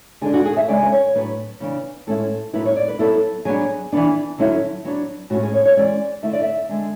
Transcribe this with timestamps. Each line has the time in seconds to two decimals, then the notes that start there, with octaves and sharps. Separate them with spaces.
0.21 D3 G#3 D4 G#4
0.34 F#4
0.45 G#4
0.57 E5
0.68 C#3 G#3 C#4 D5
0.83 B4
0.92 C#5
1.15 A2 F#3 B3 D4 B4
1.60 C#3 E3 B3 D4
2.07 A2 G#3 C#4 E4 A4
2.53 A2 F#3 B3 E4 B4
2.65 C#5
2.76 D5
2.88 B4
2.99 F#3 B3 E4 A4
3.45 F#3 B3 D4 G#4
3.92 E3 B3 D4
4.38 D3 F#3 C#4 E4
4.85 F#3 B3 D4
5.30 A2 G#3 C#4 F#4
5.43 G#4
5.54 C#5
5.65 C#5
5.77 E3 G#3 C#4 D5
6.23 D3 A3 E4 E5
6.33 D5
6.42 E5
6.69 D3 G#3 D4